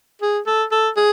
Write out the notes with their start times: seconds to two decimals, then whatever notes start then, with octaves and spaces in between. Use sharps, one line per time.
0.22 G#4
0.46 A4
0.72 A4
0.97 G#4